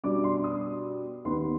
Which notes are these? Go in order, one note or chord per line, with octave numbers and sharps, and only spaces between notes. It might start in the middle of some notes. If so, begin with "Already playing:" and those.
B2 G3 D4 D6
C6
D#6
D#2 D#3 B3 C6